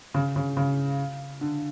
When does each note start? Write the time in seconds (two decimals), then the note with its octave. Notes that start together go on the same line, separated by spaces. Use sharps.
0.14 C#3
0.36 C#3
0.57 C#3
1.41 D3